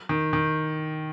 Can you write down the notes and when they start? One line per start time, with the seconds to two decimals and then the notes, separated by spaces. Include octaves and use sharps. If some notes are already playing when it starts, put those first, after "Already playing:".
0.09 D#3
0.33 D#3